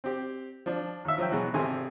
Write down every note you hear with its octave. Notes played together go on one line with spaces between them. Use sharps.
C4 G4
F3 D4
D#2 E5
F3 F#3 E5 G5
B2 E3 F#3 G#3 B3
G#1 C3 G#4 A4 G#5 C6